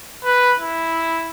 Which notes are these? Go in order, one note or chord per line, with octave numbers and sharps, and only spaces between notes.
B4
E4